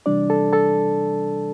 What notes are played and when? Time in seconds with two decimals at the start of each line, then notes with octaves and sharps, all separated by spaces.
0.06 C3 E3 G3 D4 D5
0.30 A4 A5
0.53 A4 A5